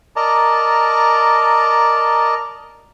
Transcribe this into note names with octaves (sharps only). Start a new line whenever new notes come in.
A#4 D5 D#5 A5 A#5